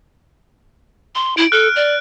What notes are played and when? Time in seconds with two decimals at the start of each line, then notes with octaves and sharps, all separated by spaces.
1.15 C6
1.37 E4 D7
1.52 A4 F6 F#6
1.76 D5